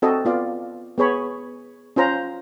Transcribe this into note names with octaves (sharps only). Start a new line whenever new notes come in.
C4 F#4 A4 D#5
B3 F4 D5 F5
B3 G#4 C#5 B5
C#4 F4 C5 A#5